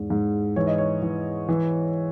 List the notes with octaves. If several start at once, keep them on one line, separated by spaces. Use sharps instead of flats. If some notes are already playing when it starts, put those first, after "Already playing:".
Already playing: E2 G#2
G#2
E3 C#5
D#5
C#5
E3
E3